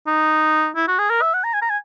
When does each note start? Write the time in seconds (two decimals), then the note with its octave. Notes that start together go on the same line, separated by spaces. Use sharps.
0.07 D#4
0.76 E4
0.88 F#4
0.99 G#4
1.10 A#4
1.22 E5
1.34 F#5
1.44 A#5
1.54 G#5
1.62 A#5
1.70 G#5